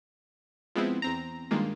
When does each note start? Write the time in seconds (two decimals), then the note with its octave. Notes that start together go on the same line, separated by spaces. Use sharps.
0.75 F3 G#3 B3 C4 E4
1.02 E2 C4 A#5
1.51 G2 D#3 G#3 A#3 F4